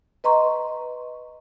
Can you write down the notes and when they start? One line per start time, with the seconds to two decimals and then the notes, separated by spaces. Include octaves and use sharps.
0.24 B4 D#5 A#5 C6 C#6